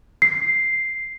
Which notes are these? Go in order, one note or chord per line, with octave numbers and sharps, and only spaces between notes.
C7